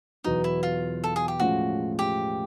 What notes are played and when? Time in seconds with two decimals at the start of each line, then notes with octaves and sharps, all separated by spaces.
0.24 E2 B2 F#3 B3 D#4
0.44 E4
0.63 F4
1.04 A4
1.16 G#4
1.28 G4
1.40 A2 F3 G#3 C#4 F4 F#4
1.99 G4